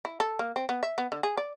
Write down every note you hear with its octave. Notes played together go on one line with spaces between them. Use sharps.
E4
A4
A#3
C4
B3
E5
B3
D3
G#4
D5